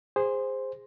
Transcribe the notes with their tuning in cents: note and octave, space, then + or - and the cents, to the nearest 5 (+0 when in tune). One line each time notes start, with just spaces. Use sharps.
G#4 -20 C5 +0